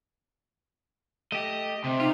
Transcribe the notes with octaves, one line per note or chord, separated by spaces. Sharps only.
A3 G4 D#5
C3
D#4 F4